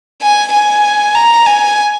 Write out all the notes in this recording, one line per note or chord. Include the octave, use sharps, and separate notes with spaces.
G#5
G#5
A#5
G#5